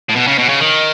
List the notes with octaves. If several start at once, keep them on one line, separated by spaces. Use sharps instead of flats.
A2
B2
C#3
B2
C#3
D#3